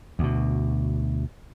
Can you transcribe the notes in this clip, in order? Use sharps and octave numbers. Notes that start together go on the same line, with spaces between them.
D2 B2